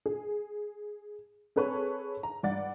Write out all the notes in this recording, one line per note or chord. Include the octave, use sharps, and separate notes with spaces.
G#4
C4 G#4 A4 B4 C#5 C#6
A#5
G2 D5 F#5 A6